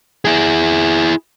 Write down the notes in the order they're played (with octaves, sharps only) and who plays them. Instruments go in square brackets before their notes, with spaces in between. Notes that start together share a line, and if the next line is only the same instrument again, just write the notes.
[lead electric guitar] E4 G#4